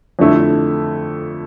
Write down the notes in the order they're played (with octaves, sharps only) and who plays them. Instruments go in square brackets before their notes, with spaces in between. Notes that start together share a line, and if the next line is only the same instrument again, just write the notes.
[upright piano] F2 D3 A3 E4